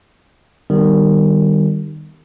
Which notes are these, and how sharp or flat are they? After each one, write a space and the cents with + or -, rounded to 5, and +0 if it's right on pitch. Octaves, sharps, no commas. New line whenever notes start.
D#3 -25 G3 +0 B3 +0